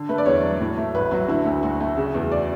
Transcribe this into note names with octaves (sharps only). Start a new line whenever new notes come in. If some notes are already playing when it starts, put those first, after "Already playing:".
Already playing: D3
A3 B4
D5
E2 C#5
F#3
A2
A3
A1 B4
F#3 F#4
D3 E4
D2
D2 F#4
A3
C#3
E2
D5